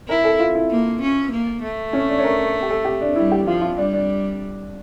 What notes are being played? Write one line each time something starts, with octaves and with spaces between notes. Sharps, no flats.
E4 A#4
A4
F4
E4
A#3
C#4
A#3
A3
C#4
D4
C#5
A#4
G4
A4
G4
D4
G3 E4
G4
F3 F4
F4
G3 D4
D4